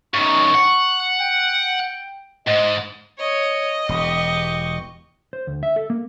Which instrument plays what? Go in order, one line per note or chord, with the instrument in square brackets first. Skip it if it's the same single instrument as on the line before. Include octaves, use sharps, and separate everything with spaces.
[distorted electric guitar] F#2 D#3 [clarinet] C#6
[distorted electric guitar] F#5
[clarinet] G5
[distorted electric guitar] G#2 [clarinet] D#5
[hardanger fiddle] C#5 [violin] D#5
[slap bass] E1 [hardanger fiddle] G4 C#6
[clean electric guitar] C5
D2
E5
A4
A#3